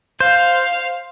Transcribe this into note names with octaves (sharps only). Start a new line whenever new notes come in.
C5 F5 F7